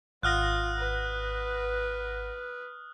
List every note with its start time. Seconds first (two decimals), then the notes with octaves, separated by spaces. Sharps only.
0.23 G#1 F4 F#5 D#6 F6 F#6 A#6
0.78 B4